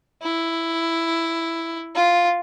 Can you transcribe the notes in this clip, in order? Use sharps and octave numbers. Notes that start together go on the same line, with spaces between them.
E4
F4